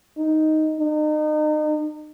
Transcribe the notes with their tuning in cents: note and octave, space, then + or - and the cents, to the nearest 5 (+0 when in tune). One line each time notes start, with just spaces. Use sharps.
D#4 +0
D#4 -35